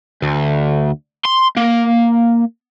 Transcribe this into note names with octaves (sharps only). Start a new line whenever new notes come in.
D2
C6
A#3